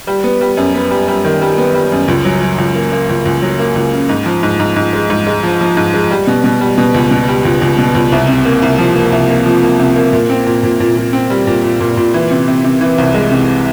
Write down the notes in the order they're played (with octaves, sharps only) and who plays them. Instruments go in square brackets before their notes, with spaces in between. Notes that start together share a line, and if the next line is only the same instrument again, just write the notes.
[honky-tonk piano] G3
B3
G3
F#2
B3
G3
G3
D#3
G3
B3
G3
F#2
C#2
F#3
F#3
C#2
A#3
A#3
C#2
C#2
F#3
A#3
C#2
C#3
G#2
F3
G#2
G#2
G#2
G#3
G#2
G#3
F3
F3
G#2
G#3
G3
B2
B2
G3
B2
C#2
B2
G3
C#2
C#2
B2
C#2
C2
C3
A#3
C2
F3
A#3
C2
A#3
F3
A#3
C3
A#3
A#2
C4
A#2
A#2
A#2
A#2
C4
G3
A#2
A#2
A#2
A#2
E3
C3
C3
C3
E3
C2
G#3
C3